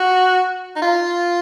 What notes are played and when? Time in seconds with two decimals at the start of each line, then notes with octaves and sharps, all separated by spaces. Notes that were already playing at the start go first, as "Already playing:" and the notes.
Already playing: F#4
0.76 D#4
0.82 F4